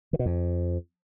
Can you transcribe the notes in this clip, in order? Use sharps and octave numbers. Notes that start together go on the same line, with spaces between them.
D#3
B2
F2